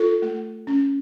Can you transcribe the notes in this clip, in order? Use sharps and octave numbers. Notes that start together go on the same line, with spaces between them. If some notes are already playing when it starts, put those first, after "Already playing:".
Already playing: F4 A4
A3
C#4